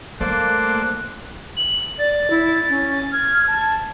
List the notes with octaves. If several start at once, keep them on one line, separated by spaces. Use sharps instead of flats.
G3 A3 A#3 A4 C5 D5 F#6
F#7
D5 A6
E4
C#4
F6 G#6
A5